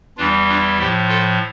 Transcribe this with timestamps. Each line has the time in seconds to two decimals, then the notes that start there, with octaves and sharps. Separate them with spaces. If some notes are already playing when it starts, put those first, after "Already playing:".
0.17 E2 E3 G3 D4 F4
0.48 D4 F4
0.78 A2 F3 E4 G4
1.09 F4 A4